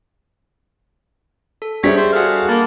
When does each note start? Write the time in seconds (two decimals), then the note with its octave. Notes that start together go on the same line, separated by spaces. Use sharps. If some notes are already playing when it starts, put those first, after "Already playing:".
1.62 A4
1.83 G3 D4 G#4 C5 C#5 E5 B6
1.97 C5 D5
2.13 F#4 G#4 A4 F5
2.49 A#3 A5 B5